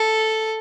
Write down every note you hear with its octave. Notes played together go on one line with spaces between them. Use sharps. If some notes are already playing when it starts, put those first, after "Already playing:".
Already playing: A4